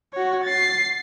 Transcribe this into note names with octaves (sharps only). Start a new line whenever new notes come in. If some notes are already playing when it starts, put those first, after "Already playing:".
F#4 C#5
A6 C7